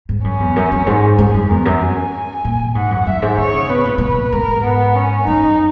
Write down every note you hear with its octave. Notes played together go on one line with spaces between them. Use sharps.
G#2
F#2 C#4
E2
F#2
F#2
G#2
G#2 G#4
F#2
E2 A#4
F#2
G#5
A#2
G#2 F#5
F#2
F#2 E5
G#2
D#3 C#5
C#3
B2 B4
A#2
B2 B4
A#2
G#2 A#4
B3
C#4
F#2 D#4